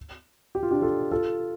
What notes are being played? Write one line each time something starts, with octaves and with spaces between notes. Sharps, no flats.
G4
F4
D4 G4
F4 A4
F4 A4